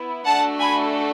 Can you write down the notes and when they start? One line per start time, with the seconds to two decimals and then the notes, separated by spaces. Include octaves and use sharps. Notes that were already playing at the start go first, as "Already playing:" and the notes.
Already playing: B3 E4
0.26 A3 D4 F#4 A4 F#5 A5
0.60 G#5 B5